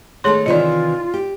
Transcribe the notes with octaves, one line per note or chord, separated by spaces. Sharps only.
D#3 A3 G#4 A4 C#5 C6
C3 D#3 E3 F4 D5 D#5
G4